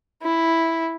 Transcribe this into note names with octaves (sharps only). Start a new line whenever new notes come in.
E4